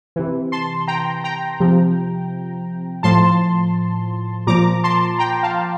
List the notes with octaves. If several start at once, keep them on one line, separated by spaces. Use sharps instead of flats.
C3 E3
A5 C6
G5 A#5
G5 A#5
C3 F3
A2 F3 A5 C6
A#2 F3 A#5 D6
A5 C6
G5 A#5
F5 A5